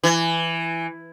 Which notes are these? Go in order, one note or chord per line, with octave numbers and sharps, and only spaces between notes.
E3